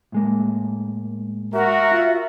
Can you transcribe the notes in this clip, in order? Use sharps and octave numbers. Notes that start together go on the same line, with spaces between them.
A2 G#3 A#3
F#4 A#4 E5
F4